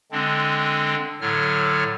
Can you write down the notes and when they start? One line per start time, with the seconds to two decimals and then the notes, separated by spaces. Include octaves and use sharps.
0.12 D3 G#3 C4 D4
1.21 A2 D3 F#3 C#5 F6